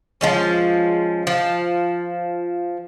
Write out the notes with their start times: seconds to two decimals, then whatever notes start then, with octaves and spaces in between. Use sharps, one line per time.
0.21 F3 G#3 C#4
1.27 F3